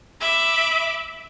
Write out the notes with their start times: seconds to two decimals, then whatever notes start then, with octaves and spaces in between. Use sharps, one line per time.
0.20 E5 B5 D6